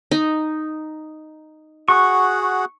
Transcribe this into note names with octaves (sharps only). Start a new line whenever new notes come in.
D#4
F#4 G#4 F#5 C#6